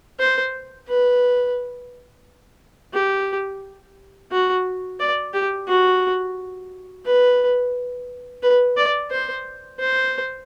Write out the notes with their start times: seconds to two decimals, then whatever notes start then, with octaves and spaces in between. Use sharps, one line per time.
0.19 C5
0.88 B4
2.93 G4
4.32 F#4
5.00 D5
5.34 G4
5.68 F#4
7.06 B4
8.42 B4
8.77 D5
9.11 C5
9.79 C5